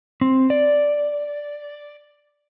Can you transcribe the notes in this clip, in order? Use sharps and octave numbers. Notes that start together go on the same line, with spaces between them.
C4
D5